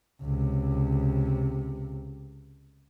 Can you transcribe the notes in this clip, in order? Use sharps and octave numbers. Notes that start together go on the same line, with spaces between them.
C#2 C3